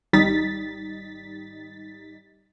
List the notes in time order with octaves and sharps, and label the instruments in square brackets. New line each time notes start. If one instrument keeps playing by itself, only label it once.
[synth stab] G#1 G3 D#4 A6 B6